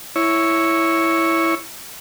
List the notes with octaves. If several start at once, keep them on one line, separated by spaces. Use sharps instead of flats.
E4 C#5